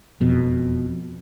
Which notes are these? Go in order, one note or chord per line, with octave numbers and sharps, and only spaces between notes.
E1 F2 B2